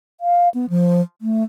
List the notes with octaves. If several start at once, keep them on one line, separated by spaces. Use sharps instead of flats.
F5
B3
F3
A3